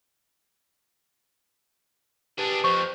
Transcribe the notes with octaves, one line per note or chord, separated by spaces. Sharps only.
D4 G4 G#4 B4 A5
F2 C5 C#6